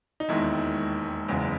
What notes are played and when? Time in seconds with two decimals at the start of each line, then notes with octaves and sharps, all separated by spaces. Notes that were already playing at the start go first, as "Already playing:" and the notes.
0.20 D#4
0.29 E1 D#2 D#3 G#3 E4
1.29 F#1 E2 C#3 G#3